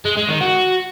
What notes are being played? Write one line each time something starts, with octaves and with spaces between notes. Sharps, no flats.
G#3
G#3
D#3
F#4